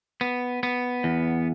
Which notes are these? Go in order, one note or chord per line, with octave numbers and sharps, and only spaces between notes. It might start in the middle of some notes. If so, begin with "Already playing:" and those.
B3
B3
E2